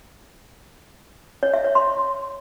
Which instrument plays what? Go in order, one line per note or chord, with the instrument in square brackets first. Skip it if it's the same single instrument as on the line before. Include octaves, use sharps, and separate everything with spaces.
[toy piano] C#5
E5
C#5
C6